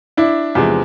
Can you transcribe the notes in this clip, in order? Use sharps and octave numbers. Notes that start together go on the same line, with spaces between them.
D4 E4
E2 C3 F3 G#3